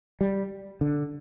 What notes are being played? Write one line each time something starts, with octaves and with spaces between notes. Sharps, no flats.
G3
D3